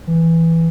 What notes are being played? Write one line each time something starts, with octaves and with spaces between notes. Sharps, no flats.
E3